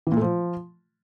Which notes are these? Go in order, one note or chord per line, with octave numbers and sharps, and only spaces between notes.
E3
A#2
A3
F3